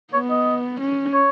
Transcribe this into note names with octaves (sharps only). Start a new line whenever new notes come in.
B3 C#5
D#5
C#4
C#5